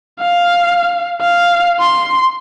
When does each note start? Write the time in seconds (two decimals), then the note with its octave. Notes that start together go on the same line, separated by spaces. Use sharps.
0.20 F5
1.21 F5
1.80 C6